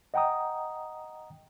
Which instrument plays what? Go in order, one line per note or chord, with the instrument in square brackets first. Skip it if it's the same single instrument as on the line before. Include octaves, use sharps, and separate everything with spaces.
[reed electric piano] D#5 F#5 G5 A#5 D#6